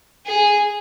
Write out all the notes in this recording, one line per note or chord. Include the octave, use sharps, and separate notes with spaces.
G#4